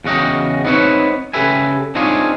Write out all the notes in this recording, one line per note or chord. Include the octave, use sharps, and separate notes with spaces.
E2 C#3 F#4 D#5 G5
B3 C4 D#4 E4 B4 C#5
C#3 G4 A4 B4 E5 G#5
C4 D4 D#4 F4 G#4 C#5